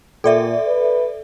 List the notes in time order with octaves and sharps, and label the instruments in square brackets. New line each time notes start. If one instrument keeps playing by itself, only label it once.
[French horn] A#2 [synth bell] A4 D5 E5
[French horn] B4